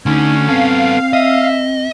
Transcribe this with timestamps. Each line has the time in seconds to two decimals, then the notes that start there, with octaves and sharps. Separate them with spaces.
0.06 D3 A3 C#4 D#4
0.48 B3 C4 A4 F5
1.13 D#5 E5